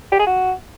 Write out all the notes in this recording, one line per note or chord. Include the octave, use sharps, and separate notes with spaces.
G4
G#4
F#4